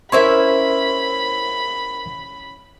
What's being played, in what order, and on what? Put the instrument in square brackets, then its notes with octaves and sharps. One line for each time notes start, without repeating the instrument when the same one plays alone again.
[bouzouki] C#4 E4 E5 [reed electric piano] A#4 C5 C6 [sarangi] B5